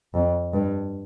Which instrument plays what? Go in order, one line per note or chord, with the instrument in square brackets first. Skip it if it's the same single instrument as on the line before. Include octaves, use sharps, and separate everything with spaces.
[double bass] F2
G2